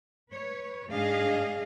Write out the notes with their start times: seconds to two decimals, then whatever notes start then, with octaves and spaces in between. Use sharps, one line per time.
0.31 B4 C#5
0.91 G#2 D4 G#4 D#5 F5